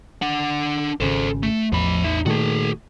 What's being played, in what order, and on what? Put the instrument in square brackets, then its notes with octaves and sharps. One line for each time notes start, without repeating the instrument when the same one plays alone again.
[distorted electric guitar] D4 F#5
[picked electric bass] G#1 C#3 [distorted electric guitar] A4 C5
[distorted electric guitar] A3
[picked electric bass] A1 E2 [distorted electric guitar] F3 B5
[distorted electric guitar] D#4 E5
[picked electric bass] A#2 D#3 A3 [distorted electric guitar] F#4 G#4